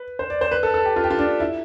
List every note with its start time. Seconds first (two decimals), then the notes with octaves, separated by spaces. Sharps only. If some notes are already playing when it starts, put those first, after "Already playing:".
Already playing: B4
0.19 C5
0.30 D5
0.41 C5
0.51 B4
0.63 A4
0.74 A4
0.85 G4
0.96 F4
1.04 G4
1.10 F4
1.19 D4
1.40 E4